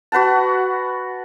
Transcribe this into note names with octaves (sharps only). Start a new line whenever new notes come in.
F#4 B4 F#5 A5